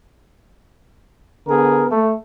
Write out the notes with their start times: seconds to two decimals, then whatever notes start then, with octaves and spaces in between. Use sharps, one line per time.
1.48 D3 B3 G#4 A#4
1.91 A3